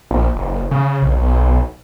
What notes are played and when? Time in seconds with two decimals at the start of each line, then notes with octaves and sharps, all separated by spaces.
0.11 A#1
0.36 F#1
0.71 C#3
1.02 B1
1.17 B1